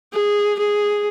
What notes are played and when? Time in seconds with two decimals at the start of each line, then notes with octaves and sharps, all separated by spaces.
0.13 G#4
0.58 G#4